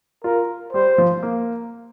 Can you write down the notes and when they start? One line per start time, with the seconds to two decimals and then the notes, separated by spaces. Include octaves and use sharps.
0.24 F4 A#4
0.73 G3 C5
0.98 F3
1.23 A#3